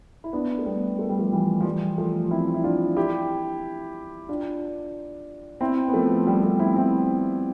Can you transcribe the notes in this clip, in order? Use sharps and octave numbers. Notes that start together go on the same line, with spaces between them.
E4
B3 D4
A3
G3 B3
A3
G3
F3 A3
E3 G3
F3
E3 G3
F3 A3
C4 E4
E4
D4 F4
E4 G4
D4 F4
C4 E4
B3
F3 A3
G3 B3
A3 C4
C4 E4
C4 E4